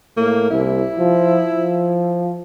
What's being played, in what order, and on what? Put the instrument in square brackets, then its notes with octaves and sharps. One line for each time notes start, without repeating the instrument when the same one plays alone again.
[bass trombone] A2 [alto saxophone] A#3
[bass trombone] C2 [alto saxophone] E4
[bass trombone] F3
F3